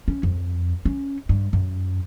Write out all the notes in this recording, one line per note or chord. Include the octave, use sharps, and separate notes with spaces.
C#4
F2
C#4
G2
F#2